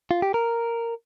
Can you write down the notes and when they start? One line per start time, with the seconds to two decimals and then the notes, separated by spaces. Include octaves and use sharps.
0.11 F4
0.22 G4
0.34 A#4